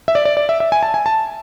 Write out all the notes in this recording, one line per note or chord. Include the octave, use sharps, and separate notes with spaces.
E5
D5
D5
D5
E5
E5
G#5
A5
G#5
A5